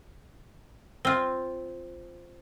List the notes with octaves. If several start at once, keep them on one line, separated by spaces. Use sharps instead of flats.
C4 F4